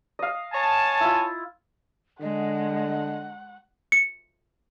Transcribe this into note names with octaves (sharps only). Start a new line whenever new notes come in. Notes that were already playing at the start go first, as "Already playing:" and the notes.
D#5 F5
C#5 G#5 A5
E4 F4
D3 G#3 D#5 F#5
C#7